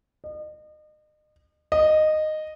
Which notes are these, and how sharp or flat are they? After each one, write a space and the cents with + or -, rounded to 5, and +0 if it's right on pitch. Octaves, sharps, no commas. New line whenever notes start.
D#5 -35
D#5 -10